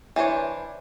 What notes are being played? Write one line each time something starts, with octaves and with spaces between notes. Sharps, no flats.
E3 D4 C5 C#5